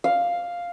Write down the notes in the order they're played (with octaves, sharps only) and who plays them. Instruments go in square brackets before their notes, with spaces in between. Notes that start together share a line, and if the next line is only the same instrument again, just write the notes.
[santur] F5